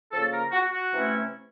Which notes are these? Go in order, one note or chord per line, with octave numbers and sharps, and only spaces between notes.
C#3 F3 A#3 A4
A#4
F#4
F#4
C3 E3 A3 C#4 E4